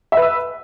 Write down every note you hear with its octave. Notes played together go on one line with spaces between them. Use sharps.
B4 E5 E6